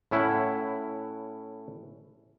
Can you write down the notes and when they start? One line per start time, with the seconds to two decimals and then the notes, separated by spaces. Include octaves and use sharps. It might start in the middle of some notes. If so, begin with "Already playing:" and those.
0.11 A2 C#4 E4 F#5